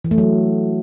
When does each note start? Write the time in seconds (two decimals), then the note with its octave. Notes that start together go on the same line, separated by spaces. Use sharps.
0.04 E3
0.11 A3
0.18 F#3